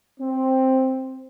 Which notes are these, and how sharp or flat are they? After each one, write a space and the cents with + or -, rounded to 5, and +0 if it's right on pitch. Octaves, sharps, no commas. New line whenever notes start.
C4 +5